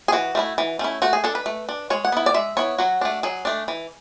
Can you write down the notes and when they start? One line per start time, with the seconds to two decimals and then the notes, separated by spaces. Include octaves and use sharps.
0.08 G#4
0.12 E3 F#4
0.35 A3 C#4 E4
0.58 E3
0.79 A3 C#4 E4
1.02 A3 F#4
1.13 G#4
1.24 D4 A4
1.35 B4
1.46 A3
1.69 D4
1.90 G#3 C#5
2.05 F#5
2.12 B3 E4
2.26 D5
2.34 G#3 E5
2.57 B3 E4 C#5
2.78 F#3 F#4
3.01 A3 D4
3.23 F#3 G#4
3.45 A3 D4
3.68 E3